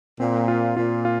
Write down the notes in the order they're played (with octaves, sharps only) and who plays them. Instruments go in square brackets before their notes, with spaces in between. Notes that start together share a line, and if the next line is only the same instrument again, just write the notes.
[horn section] A#2 [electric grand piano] C4
[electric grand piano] F4
[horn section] A#2 [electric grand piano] F4
[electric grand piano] F4